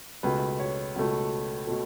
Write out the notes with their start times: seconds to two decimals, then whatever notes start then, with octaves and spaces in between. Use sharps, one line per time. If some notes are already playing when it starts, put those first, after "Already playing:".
0.23 C#2 B2 A3 B4
0.60 C#5
0.96 C#2 B2 A3
1.67 B2 A3